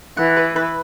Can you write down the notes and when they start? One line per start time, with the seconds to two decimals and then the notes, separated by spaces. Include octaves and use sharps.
0.17 E3 F#5
0.37 B4
0.56 B4